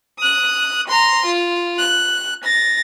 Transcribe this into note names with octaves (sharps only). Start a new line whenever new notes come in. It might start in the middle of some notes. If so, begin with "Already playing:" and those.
D#6 F#6
A#5 C6
F4
F#6
A6 A#6